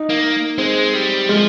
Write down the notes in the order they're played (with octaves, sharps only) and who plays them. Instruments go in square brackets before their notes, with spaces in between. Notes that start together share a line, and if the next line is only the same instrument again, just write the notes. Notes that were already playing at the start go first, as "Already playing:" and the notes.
Already playing: [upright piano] D#4
[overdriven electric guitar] A#3
[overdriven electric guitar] G#3 [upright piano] C4
[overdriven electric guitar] G3
[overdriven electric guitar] F3 [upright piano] G#3